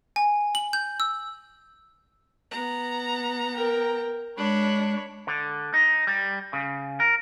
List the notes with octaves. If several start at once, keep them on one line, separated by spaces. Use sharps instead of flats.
G#5
F#7
G6
E6
B3 A#5
A#4 G5
G#3 D4 C#5 B5
D3
D#4
G3
C#3
A#4